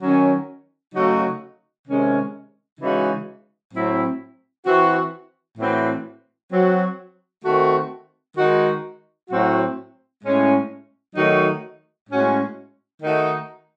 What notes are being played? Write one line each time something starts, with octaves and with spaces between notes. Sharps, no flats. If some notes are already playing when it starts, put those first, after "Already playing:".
D#3 F#3 C#4
C#3 F#3 A3 D#4 F#4
C3 D#3 G#3 C#4
C#3 E3 G#3 D#4 F#4
A2 F#3 C4 E4
E3 C4 F#4
A2 E3 C4 F#4
F#3 C4 F#4
D#3 A3 C4 F#4
D#3 G#3 D#4 F#4
A2 F#3 C4 F#4
A2 G#3 C#4
D#3 F#3 A3 D#4 F#4
A2 G#3 C#4 F#4
D#3 A3 D#4 F#4